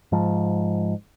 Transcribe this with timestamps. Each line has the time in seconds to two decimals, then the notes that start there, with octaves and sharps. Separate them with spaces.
0.12 G#2 F3